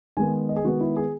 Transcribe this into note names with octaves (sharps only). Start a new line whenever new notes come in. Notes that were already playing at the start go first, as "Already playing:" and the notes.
D#3 G#3 B3 G#5
D#5
G#4
D#3 G#3 B3 F#4
E4
G#4